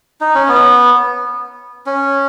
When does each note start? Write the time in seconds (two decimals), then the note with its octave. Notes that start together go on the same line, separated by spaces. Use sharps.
0.21 D#4
0.35 C#4
0.49 B3
1.86 C#4